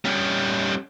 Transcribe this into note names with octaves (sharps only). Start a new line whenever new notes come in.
G3 C#4